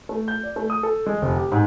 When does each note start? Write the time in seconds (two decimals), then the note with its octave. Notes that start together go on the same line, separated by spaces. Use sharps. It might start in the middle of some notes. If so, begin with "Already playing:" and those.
0.09 A3
0.28 G6
0.43 D5
0.56 A3
0.70 D#6
0.83 A4
1.06 G#3
1.22 F1
1.36 G4
1.52 G#2